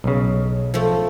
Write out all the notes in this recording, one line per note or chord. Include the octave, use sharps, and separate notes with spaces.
B1 C#3
F3 A3